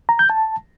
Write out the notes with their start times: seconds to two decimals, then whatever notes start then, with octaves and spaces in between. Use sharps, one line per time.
0.09 A#5
0.19 G6
0.30 A5